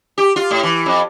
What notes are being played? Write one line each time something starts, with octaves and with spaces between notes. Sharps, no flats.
G4
F4
A2
E3
F2